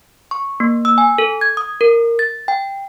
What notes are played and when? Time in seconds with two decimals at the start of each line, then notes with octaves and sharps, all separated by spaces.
0.31 C#6
0.60 A#3
0.85 E6
0.98 G#5
1.18 A4
1.41 G#6
1.57 D#6
1.81 A#4
2.19 A6
2.48 G5